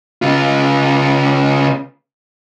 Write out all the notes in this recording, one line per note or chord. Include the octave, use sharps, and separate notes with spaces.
C#3 F4